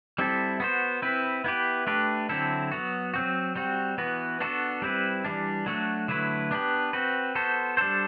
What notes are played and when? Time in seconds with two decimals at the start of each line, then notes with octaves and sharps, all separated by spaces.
0.18 G3 C4 E4 A4
0.60 B3 F#4 C5
1.02 C4 E4 B4
1.44 B3 E4 G4 B4
1.87 A3 D4 G4 B4
2.29 D3 F#3 C4 E4 A4
2.72 F#3 B3 F#4
3.14 F#3 C4 F#4
3.55 G3 C4 F#4
3.98 E3 B3 F#4 B4
4.40 B3 D4 F#4 A4
4.82 G3 C4 E4 B4
5.25 E3 G3 D4
5.66 F#3 A3 D4 F#4
6.08 D3 F#3 A3 E4 B4
6.51 B3 D4 G4 B4
6.93 C4 F#4 B4
7.35 B3 F#4 A4 C5
7.77 G3 D4 A4 C5